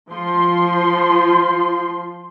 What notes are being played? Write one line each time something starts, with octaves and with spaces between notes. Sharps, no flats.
F3 C6